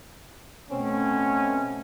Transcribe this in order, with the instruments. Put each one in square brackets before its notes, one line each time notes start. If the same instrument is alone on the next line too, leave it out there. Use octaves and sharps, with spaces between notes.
[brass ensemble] B2 A3 C#4 [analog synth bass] C4